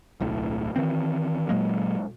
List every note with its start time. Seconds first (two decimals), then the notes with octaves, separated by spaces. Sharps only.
0.20 D1 B1 A2
0.76 D#3 E3 C4
1.49 A#2 F#3 G#3 A#3